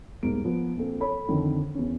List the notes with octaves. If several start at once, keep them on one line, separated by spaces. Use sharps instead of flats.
D#1 G#2 B2 A#3 D7
F3 B3
A#1 C4 A4
A4 C#5 B5
F2 D3 D#3
E2 C#4